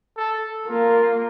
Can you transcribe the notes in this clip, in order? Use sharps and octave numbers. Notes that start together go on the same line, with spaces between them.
A4
A#3 F4